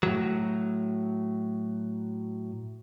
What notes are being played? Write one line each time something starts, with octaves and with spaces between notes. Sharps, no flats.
A2 F#3